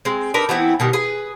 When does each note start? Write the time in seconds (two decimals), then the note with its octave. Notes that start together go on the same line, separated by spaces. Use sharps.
0.05 G#3 C4
0.34 D4 D#4 A#4 B4
0.49 E3 B3 C4 E4
0.80 B2 D#3 G3
0.93 G#4 B4